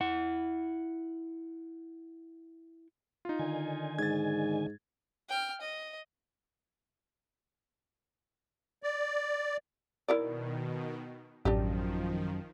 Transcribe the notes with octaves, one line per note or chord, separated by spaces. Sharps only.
E4 F#5
D#4 F4
D3 D#3 G#5
G#2 G#6 A6
G5 F6
D#5
D5
B2 D#3 E4 A#4 D5
A1 F#2 D#3 F3 D4 G4